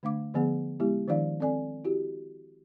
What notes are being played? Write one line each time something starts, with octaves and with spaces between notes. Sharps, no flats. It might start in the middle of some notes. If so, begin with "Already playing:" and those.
D3 A3 D4 F5 D6
D3 F3 B3 G#4 F#5
G#3 B3 E4 G4
D#3 F3 D4 E4 D5 F5
C4 A4 D5 G#5
E4 F#4 G4